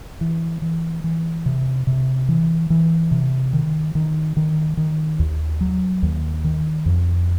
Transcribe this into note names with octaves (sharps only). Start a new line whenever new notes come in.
E3
E3
E3
C3
C3
E3
E3
C3
D#3
D#3
D#3
D#3
D#2
F#3
D#2
D#3
F2